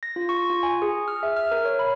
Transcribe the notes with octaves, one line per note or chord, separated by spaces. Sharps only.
A#6
F4
C#6
F4
G#5
G#4
F6
E5
F6
A#4
C#5
B5